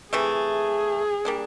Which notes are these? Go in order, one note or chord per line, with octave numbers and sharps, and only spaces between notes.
C3 E3 A3 G#4
G3 A#3 D4